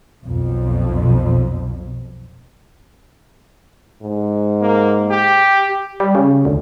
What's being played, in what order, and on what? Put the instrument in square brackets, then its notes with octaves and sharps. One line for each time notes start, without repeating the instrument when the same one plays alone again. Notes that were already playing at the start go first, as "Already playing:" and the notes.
[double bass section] B1 F2
[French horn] G#2
[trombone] A#3
G4
[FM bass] G3
C#3
D2